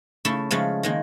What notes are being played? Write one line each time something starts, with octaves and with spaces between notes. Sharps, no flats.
C#3 A3 E4
C#3 F3 G#3 A3
D#3 G#3 A#3